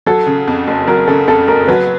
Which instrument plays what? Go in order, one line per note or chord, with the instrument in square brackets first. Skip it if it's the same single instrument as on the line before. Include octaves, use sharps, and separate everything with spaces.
[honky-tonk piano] F#3 [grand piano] A4
[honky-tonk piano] C#3
F2
F#1
[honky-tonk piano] F#3 [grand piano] A#4
[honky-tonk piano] C#3 [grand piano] A4
[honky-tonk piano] F2 [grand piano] A4
[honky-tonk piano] F#1 [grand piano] A#4
[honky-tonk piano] F#3 [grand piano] B4